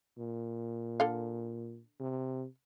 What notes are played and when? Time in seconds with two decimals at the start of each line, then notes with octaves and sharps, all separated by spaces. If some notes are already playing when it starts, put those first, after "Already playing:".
0.18 A#2
1.00 D3 A4 F5
2.00 C3